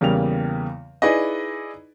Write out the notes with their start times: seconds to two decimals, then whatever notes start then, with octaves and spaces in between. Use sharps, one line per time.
0.01 E2 C#3 G3 A#3 F7
1.02 D#4 E4 G#4 B4 D5 D#5